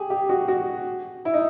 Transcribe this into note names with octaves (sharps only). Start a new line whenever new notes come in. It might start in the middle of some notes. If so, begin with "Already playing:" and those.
Already playing: G4 G#4
G4
F#4
F#4
E4
D#4